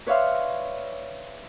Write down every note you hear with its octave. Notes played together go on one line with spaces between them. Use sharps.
B4 C#5 D5 E5 F5 C6